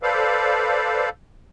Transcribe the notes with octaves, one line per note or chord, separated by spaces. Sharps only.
A4 B4 C5 D5 F5